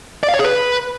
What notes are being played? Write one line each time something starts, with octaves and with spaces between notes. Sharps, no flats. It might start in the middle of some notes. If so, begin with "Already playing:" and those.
D5
F5
C#5
G#4
B4